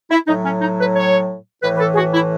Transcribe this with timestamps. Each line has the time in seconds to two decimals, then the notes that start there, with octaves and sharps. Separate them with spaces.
0.11 E4
0.27 A2 F#3 D#4
0.44 C#4
0.61 D#4
0.79 B4
0.96 C#5
1.63 A2 E3 B4
1.75 B4
1.80 A4
1.93 G#4
1.97 F#4
2.14 E4